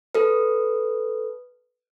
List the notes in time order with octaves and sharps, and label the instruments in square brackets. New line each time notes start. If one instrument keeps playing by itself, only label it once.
[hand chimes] A4 B4